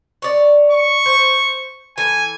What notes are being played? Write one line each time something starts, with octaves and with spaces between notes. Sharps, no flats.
C#5 D5
C#6
C5
E3 A4 G#5